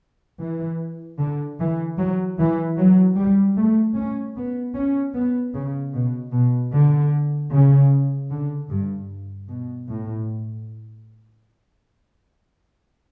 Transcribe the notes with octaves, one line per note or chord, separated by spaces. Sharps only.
E3
D3
E3
F#3
E3
F#3
G3
A3
C#4
B3
C#4
B3
C#3
B2
B2
D3
C#3
D3
G2
B2
A2